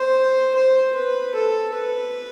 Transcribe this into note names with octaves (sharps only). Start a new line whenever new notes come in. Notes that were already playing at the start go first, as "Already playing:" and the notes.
Already playing: C5
C5
B4
A4
B4